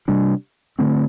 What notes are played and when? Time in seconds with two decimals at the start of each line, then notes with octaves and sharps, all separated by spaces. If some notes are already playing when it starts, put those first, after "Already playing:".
0.08 C3 G3 D4
0.79 D3 A3 C4